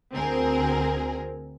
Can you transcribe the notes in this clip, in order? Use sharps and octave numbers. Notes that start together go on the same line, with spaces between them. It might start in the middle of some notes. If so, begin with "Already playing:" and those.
D2 C4 G#4 A#4